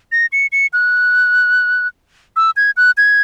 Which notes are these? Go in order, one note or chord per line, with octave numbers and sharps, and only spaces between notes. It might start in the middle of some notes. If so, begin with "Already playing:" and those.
A#6
C#7
C#7
F#6
E6
G#6
F#6
G#6